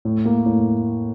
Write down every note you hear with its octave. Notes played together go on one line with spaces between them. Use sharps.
A2
A#3
A2